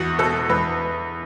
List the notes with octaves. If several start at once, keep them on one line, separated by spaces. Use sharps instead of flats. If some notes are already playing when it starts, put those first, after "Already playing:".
Already playing: E2 F#4
B2 A4
E2 B4